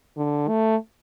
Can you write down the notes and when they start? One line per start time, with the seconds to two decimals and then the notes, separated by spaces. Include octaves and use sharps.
0.17 D3
0.48 A3